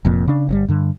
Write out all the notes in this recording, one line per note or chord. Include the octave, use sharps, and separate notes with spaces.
F1 F2 A#2
C#3 D4
G1 C#3 G3
G2 D3